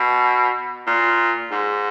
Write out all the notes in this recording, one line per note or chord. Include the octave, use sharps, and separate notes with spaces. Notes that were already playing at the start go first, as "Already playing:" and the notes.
Already playing: B2
A#2
G#2